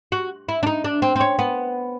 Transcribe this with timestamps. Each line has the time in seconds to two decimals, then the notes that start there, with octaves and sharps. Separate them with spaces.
0.12 F#4
0.49 E4
0.63 D4
0.67 D#4
0.84 D4
1.02 C4
1.16 C4
1.20 C#4
1.39 B3